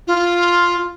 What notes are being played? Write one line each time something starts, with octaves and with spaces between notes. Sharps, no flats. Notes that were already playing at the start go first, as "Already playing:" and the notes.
F4